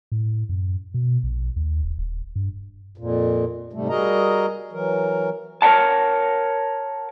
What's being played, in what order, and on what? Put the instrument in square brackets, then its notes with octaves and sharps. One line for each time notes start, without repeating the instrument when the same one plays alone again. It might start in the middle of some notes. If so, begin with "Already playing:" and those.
[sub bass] A2
F#2
B2
A#1
D#2
D1
D#1
G2
[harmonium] F2 A#2
G#2 C3 G3 A3
G3 F#4 G#4 A#4 D#5 A#5
E3 F#3 A#4
[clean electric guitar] A#4 C#5 E5 F#5 A5